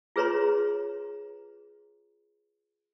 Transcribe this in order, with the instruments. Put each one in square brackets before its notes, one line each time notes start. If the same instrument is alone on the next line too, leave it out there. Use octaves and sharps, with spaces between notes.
[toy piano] F4 G#4 B4 C#5 A#5 C6